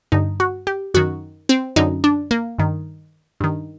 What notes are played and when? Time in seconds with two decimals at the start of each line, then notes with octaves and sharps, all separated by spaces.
0.12 G2 D3 D#4
0.40 F#4
0.67 G4
0.94 F#2 D#3 F#4
1.49 C4
1.76 F#2 D3 D#4
2.04 D4
2.31 A#3
2.58 G2 D#3
3.40 G2 D#3